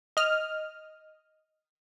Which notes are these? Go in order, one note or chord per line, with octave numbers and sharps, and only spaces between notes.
D#5 F6